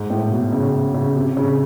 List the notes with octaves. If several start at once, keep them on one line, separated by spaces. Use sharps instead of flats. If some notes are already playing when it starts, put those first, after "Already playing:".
Already playing: G#2
A2
B2
C#3
C#3
C3
C#3